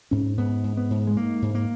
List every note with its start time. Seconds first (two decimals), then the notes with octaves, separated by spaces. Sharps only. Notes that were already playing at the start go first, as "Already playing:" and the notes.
0.11 G#2 C#4
0.37 G#2 B3
0.64 G#2
0.77 B3
0.91 G#2
1.07 G#3
1.17 G#2 A#3
1.42 G#2
1.55 A#3